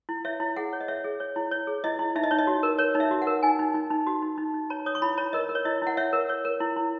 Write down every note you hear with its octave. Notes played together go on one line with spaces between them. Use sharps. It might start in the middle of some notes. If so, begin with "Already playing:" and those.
E4
C#5 E5
E4
G#4 F#5
C#5
D#5
C#5 E5
G#4
C#5
E4
C#5
G#4
E4 D#5
E4
D#4 E5
D#5
D#4 C#5
D#5
F#4
A#4
A#4 C#5
D#4
E5
F#4
F#5
A#4
D#4 G#5
D#4
D#4
D#4
F#4
D#4
D#4
D#4
C#5 A#5
C#5 D#6
C#6
E4 B5
C#5 A#5
A#4 D#5
A#4
C#5
E4 D#5
E4 F#5
C#5 E5
A#4
C#5
A#4
E4
E4